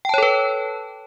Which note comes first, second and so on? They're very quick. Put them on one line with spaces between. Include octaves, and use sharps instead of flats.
G5 A5 C#5 A4 B4